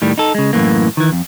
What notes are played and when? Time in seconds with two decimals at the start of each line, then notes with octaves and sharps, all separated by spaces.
0.02 A2 D#3 G3
0.18 D#4 A4
0.35 C#3 G#3
0.53 F#2 A2 E3 A#3
0.97 D#3 E3
1.13 F2